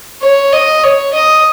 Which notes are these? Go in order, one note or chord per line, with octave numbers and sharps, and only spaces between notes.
C#5
D#5
C#5
D#5